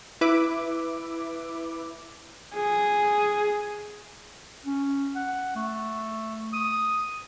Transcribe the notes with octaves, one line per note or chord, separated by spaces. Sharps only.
E4 B4 E5 D6
G#4
C#4
F#5
A3
D#6